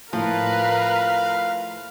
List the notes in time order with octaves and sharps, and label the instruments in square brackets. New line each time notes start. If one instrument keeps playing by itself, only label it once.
[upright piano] A2 [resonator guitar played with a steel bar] F3 [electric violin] A#4 B4 [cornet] F5